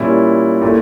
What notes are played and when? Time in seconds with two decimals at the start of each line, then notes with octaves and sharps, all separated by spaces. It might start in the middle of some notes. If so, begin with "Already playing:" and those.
Already playing: A#2 G3 C#4 E4
0.62 A#2 A3 E4